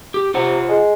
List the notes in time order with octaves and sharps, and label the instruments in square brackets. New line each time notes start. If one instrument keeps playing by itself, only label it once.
[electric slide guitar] G4
[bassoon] C3 [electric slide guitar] F4 C5 F#5
[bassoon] G#3